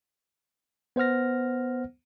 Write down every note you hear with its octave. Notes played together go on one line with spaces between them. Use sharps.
B3 C5 F#5 F6 A#6